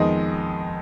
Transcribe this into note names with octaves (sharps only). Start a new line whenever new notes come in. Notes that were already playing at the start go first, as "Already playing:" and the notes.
Already playing: F2 D#3 G#3 B3 D#5